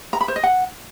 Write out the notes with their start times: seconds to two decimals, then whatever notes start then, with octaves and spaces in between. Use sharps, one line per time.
0.13 A#5
0.21 B5
0.28 C5
0.36 D#5
0.43 F#5